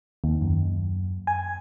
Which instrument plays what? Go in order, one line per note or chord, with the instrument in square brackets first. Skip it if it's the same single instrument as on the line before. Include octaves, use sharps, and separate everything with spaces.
[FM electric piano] D#2
F#2
G#5